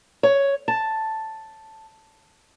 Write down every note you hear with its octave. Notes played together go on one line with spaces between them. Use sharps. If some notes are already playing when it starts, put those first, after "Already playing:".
C#5
A5